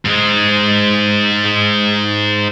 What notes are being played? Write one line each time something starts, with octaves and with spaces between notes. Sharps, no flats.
G#2 G#3